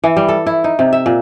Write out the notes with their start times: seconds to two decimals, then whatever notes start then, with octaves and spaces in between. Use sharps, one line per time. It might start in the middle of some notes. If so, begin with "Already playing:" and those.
0.04 E3
0.16 G3
0.29 A4
0.47 E4
0.64 D#4
0.79 C3
0.93 E5
1.06 A#2